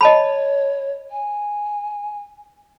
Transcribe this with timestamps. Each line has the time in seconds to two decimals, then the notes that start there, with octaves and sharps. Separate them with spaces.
0.01 C#5 D#5 A5 B5
1.11 G#5